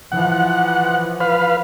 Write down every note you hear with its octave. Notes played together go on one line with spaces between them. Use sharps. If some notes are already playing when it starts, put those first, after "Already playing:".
E3 F3 F#5
B4 F5